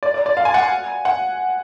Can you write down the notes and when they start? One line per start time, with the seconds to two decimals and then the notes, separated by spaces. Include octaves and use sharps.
0.03 D5
0.14 D5
0.26 D5
0.37 F5
0.45 G#5
0.54 F#5
0.63 G#5
1.05 F#5